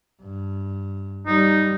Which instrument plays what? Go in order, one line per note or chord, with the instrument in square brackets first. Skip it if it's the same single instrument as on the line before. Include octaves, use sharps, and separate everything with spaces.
[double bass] G2
[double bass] G3 [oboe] D#4